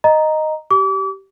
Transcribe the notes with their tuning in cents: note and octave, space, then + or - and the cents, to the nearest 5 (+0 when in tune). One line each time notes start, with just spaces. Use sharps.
D#5 -5 A#5 +0
G4 -20 D6 -35